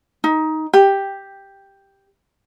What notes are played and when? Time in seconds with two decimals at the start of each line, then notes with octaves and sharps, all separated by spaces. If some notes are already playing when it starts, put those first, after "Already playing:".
0.24 D#4
0.73 G4